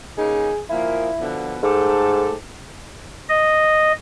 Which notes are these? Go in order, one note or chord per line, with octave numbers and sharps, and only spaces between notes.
C#3 A#3 D#4 G#4
A#2 F3 A#3 E4
B2 D3 F3
G#2 A3 G4 A4
D#5